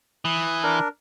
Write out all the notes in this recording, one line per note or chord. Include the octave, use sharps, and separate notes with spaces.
E3 D#6
D4 A#4